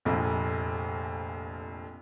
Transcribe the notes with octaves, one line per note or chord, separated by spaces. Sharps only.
F1 A#1 F2